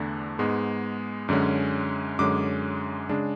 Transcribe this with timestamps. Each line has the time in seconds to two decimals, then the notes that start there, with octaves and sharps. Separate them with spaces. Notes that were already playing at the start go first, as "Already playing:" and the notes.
Already playing: E2 D3 A3 D4
0.39 G#2 G#3 B3
1.29 F#2 D3 G#3 C#4
2.19 F#2 D3 G#3 C#4 D6
3.09 C#3 G#3 D4